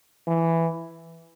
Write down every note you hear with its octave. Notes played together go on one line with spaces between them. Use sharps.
E3